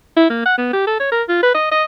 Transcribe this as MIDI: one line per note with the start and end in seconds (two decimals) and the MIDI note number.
0.17 0.29 64
0.30 0.44 58
0.46 0.56 78
0.58 0.69 59
0.73 0.86 67
0.87 0.97 69
1.00 1.08 73
1.12 1.23 70
1.29 1.41 65
1.43 1.52 71
1.55 1.70 75
1.71 1.84 75